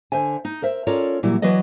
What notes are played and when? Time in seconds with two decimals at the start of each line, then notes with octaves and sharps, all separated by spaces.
0.12 D3 C5 E5 G#5
0.45 D#4
0.62 A#4 C5 E5
0.87 C#4 F4 A4 A#4 C#5 D5
1.23 A#2 E3 F#3 G3 E4
1.42 E3 F#3 B4 D5 D#5